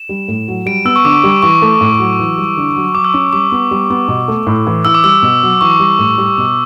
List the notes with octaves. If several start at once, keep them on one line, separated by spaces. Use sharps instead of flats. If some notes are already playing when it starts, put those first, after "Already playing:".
Already playing: E7
G3
A2
F#3
G3 D7
B3 E6
C#6
D3 D6
G3
E3 C#6
A3
A2
F#3
E3
G3
D3
F#3
F#3 D6
E6
C#4 D6
G3 D6
B3
G3
B3
B2
A3
A2
E3
E3 E6
D6
G3 E6
B2
F#3
E3 C#6
G3
A2
G3
B2 D6